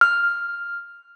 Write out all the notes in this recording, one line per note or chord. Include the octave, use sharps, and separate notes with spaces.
F6